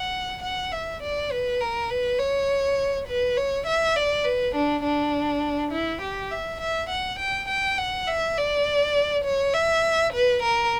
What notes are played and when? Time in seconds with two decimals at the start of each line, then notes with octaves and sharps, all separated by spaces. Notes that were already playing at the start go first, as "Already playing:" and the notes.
Already playing: F#5
0.43 F#5
0.72 E5
1.02 D5
1.31 B4
1.61 A#4
1.90 B4
2.19 C#5
3.08 B4
3.37 C#5
3.67 E5
3.96 D5
4.25 B4
4.55 D4
4.84 D4
5.72 E4
6.02 G4
6.31 E5
6.61 E5
6.90 F#5
7.19 G5
7.49 G5
7.78 F#5
8.07 E5
8.37 D5
9.25 C#5
9.54 E5
10.13 B4
10.42 A#4